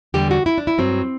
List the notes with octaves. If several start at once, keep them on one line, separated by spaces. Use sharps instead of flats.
E2 D3 G3 G4
F#4
E4
D4
E4
G2 F#3 C4